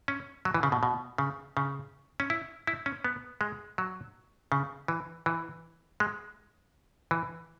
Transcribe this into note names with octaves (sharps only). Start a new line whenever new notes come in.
C#4
F#3
E3
C#3
B2
B2
C#3
C#3
C#4
E4
E4
C#4
B3
G#3
F#3
C#3
E3
E3
G#3
E3